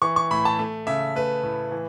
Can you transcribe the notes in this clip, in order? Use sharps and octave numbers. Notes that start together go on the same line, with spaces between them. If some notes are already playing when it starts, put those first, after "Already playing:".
E3 C#6
C#6
A2 B5
A5
A3
C#3 E5
A3 B4
A2
E3